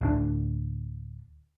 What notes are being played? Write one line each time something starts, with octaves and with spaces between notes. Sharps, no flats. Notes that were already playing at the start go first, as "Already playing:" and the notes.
D1 D2 D4